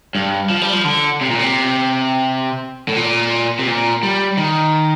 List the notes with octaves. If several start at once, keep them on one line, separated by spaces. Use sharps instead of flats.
G2
F3
G3
F3
D3
C3
A#2
C3
A2
A#2
C3
A#2
G3
D#3